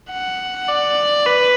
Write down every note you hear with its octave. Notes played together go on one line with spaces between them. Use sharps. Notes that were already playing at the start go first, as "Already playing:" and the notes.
F#5
D5
B4